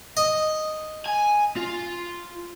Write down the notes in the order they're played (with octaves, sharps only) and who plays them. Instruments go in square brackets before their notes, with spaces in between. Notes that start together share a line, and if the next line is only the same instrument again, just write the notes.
[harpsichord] D#5
[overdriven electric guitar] G#5
F4